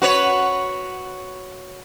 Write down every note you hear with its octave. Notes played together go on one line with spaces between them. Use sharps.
F#4 B4 C#5